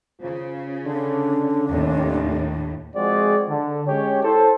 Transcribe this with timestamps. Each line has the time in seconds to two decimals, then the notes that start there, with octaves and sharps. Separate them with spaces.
0.21 C#3 F4 C5
0.86 D3 C#4 D4
1.69 F1 D#2 A2
2.96 F3 G#3 C4 F#4 G#4 D5
3.49 D3
3.87 G#3 C#4 G4 C#5
4.23 E4 A4 C5